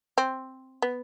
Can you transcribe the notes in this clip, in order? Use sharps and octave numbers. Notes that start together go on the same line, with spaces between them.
C4
B3